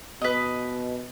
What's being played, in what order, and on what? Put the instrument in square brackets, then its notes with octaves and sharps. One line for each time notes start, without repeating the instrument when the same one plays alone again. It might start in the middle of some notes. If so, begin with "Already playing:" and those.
[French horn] B2 [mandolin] B4 D#5